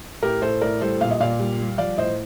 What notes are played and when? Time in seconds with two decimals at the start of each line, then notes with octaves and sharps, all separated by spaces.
0.22 A2 G4 A#4
0.42 A2 A4 C5
0.62 A2 A#4 D5
0.81 G3 A4 C5
1.01 A#2 F5
1.11 D#5
1.20 A#2 D5 F5
1.39 G3
1.59 G3
1.78 F3 D5 F5
1.98 A2 C5 D#5